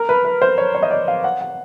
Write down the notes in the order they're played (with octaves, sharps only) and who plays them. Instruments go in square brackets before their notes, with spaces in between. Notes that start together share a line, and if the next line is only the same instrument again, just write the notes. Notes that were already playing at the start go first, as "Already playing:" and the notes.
Already playing: [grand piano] A#4
B4
B4
C5
C#5
C#5
D#5
D5
F5
F#5
F#5